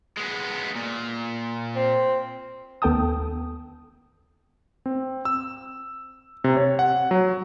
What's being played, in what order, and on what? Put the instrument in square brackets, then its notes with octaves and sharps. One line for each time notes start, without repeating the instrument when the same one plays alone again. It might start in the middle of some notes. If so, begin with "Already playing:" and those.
[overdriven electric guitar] G#3 B3
A#2
[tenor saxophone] C4
[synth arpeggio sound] D#2 B3 A4 G5 A5 D#6
[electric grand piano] C4
E6
C3
C#5
F#5
F#3